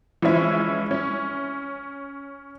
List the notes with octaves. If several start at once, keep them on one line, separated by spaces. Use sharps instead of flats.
E3 F3 G#3 C#4 E4
C#4